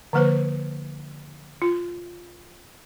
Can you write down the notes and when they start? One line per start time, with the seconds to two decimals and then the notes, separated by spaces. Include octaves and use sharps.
0.13 D3 F3 A#3 B4 C5
1.62 F4